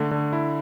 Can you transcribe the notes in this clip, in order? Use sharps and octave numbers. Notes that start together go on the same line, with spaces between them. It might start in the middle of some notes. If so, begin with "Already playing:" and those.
Already playing: D3 A3
D3
E4